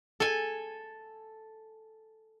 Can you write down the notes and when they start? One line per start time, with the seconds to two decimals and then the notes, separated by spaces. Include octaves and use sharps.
0.20 A4 G#5